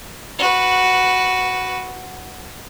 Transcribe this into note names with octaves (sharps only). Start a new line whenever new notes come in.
F#4 B4